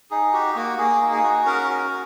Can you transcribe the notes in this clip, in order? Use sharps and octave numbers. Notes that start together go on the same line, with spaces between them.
D#4 G#4
F#4 G4
A#3 F#4
A#3 G#4
D#4
G#4
F#4
C#4 A#4
F#4